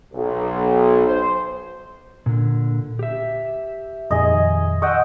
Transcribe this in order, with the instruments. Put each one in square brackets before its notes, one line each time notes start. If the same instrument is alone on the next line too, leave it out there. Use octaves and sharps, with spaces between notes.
[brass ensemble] B1
C5
[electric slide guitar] A#2 D3
G4 E5
[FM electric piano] F2 A#2 D#3 [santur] G#4 D#5
[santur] D#5 F#5 G5 [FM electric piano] C#6 D#6 E6